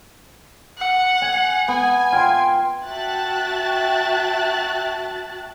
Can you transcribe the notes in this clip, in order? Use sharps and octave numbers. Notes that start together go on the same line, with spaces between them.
F#5
G#5
B3 G#5
F4 G5 C6
F#4 E5 G5 A5 F#6 A6